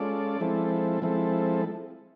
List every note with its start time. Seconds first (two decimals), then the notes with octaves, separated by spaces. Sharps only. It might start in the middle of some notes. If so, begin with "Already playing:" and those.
Already playing: G#3 C#4 F4 A4 D5
0.40 F3 G#3 C4 E4 A4
1.02 F3 G#3 C4 E4 A4